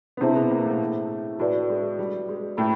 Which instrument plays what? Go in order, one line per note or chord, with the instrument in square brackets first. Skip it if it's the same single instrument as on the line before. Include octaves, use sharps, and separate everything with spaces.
[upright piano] B3
[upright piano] C3 C4 [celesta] E4 G#4 C5 E5 A5
[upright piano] B2 B3
A#2 A#3
A2 A3
[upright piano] A2 A3 [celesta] F#4 B4 D5
[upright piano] G#3
G3
G#3
[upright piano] A2 A3 [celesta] G5 B5